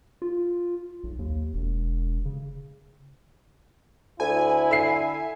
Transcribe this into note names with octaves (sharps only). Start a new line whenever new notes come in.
F4
B1
D#2
E1
C#3
D2 E4 G#5
D3 E5 C7